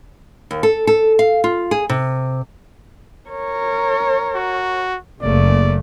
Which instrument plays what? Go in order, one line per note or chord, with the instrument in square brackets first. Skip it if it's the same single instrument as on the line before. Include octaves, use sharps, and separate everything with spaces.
[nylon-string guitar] D#2
A4
A4
F5
F4
G#4
C3
[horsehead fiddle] A#4 C#5
[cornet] F#4
[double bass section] F#1 C#3 A#3 [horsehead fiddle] A3 [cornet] D5